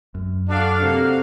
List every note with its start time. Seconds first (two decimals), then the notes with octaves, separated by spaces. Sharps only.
0.15 F#2
0.48 D4 F#4 A4 F5
0.82 C3 A#3